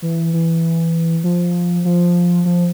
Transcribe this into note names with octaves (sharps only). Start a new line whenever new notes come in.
E3
E3
F3
F3
F3